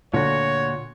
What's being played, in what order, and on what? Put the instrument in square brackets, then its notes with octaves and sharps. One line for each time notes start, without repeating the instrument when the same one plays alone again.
[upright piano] D2 [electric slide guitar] A#2 F#4 [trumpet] C#5